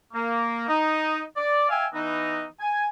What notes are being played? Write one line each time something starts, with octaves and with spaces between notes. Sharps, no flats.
A#3
D#4
D5
E5 F5 G5 G#5
E3 B3 D#4
G#5